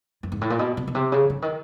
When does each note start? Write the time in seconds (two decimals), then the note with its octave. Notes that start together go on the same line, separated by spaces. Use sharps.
0.23 F#2
0.32 G#2
0.41 A2
0.50 A#2
0.59 B2
0.77 B2
0.88 B2
0.95 C3
1.12 C#3
1.30 D3
1.42 D#3